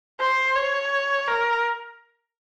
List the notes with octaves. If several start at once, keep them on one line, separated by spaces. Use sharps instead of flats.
C5
C#5
A#4